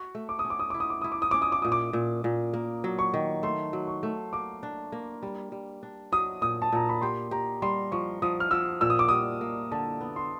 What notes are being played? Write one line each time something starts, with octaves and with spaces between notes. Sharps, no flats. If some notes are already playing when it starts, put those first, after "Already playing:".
Already playing: F#4 C#6
A3
D6
D#6
C#4
D6
D#6
E4 D6
D#6
D6
E4 D#6
D6
D#6
C#4 D6
D#6
D6
A#2 D#6
D6
A#2
A#2
A#3
F#3
C#6
D#3
A3 C6
F#3
C#6
A3
A#3 D6
D4
A#3
G3
G3
D4
F#3 D#6
A#2 D#6
A5
A#2 A#5
B5
G4 C6
G4 A#5
G3 C6
F3 C#6
F3 D#6
F6
F3 E6
A#2 E6
D#6
D6
G3 D#6
A#3
D3 A5
B3
C6